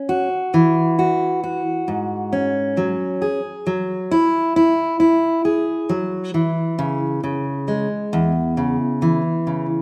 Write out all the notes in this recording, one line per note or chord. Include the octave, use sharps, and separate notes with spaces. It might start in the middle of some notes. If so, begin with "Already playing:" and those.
Already playing: C#4
F#4
E3
F#4
F#4
G#2
C#4
F#3
G#4
F#3
E4
E4
E4
G#4
F#3
E3
C#3
C#3
G#3
E2
C#3
E3
C#3